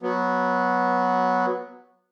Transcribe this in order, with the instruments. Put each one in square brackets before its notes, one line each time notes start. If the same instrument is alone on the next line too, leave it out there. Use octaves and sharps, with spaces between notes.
[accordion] F#3 B3